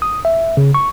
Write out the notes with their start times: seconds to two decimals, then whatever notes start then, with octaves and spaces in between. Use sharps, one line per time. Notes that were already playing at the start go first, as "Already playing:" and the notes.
0.02 D#6
0.25 E5
0.57 C#3
0.74 C#6